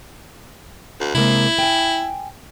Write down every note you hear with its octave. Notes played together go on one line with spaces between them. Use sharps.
D2
C3 G#3 A#3 E4
G5 G#5